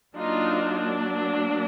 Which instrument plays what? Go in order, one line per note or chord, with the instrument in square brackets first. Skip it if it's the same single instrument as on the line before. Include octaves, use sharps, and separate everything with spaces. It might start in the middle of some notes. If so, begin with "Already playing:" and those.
[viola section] F#3 A#3 D4 D#4 F4